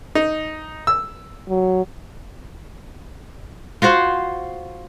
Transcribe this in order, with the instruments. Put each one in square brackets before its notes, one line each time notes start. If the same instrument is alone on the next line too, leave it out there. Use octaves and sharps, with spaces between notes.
[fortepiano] D#4
E6
[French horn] F#3
[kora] F4 F#4 C5 F#5